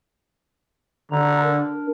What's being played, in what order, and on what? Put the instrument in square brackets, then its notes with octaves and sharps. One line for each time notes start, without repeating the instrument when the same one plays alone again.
[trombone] D3 [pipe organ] A#5
[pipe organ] D4 A#4